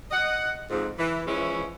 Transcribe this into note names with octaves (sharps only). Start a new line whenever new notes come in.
D#5 F#5
F2 G#2
E3
E3 F3 G#3 C#4 E4